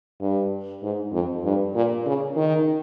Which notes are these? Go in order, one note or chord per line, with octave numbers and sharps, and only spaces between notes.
G2
G#2
F2
G2
A#2
C#3
D#3